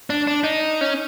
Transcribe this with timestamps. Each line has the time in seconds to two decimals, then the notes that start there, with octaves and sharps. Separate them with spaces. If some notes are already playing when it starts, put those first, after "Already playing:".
0.10 D4
0.27 D4
0.44 D#4
0.81 C#4